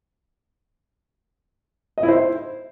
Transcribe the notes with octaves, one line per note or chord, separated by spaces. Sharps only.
D#5
E4
C5